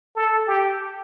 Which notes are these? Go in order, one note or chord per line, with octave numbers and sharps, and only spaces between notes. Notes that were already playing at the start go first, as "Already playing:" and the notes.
A4
G4